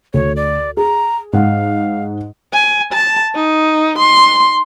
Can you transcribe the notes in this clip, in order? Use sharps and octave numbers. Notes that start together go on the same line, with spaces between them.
D2 C#5
D5
G#4 A#5
G#2 F5 F#5
G#5
A5
D#4
C6